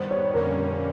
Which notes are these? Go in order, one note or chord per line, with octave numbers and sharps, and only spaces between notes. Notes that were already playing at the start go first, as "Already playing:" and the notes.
Already playing: G2 D#3 G3 B3 C5
C#5
F2 D3 G3 A#3 C#4 A#4